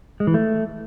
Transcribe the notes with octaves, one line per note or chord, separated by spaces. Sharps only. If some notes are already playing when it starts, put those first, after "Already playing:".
G#3
E3
A3